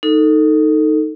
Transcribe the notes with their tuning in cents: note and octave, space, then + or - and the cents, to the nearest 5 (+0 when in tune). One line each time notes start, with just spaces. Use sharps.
D#4 +0 A4 +15